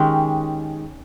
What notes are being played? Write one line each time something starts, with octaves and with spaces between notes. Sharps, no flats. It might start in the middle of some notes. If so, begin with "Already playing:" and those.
Already playing: D#3 G#3 C#4 G4